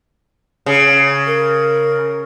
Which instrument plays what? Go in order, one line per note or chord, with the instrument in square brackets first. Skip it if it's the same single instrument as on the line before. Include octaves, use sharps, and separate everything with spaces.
[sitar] C#3
[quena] A#4